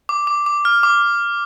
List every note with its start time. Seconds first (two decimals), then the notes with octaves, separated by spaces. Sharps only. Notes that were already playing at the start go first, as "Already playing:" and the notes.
0.09 D6
0.27 D6
0.46 D6
0.65 F6
0.83 D6